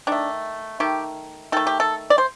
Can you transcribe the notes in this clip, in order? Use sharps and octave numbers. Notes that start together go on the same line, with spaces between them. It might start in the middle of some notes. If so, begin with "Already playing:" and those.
D#3 A3 D4
D#3 A3 G4
D#3 A3 A4
G4
A4
D5
C5